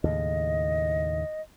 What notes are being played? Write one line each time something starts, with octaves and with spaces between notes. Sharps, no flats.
D#2 A2 C#3 D#5